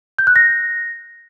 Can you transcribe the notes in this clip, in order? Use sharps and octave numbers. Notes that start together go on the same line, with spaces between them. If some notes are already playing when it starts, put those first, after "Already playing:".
G6
F#6
A#6